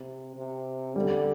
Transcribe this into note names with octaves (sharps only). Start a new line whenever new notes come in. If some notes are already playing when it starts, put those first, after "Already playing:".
Already playing: C3
C3
D3 G3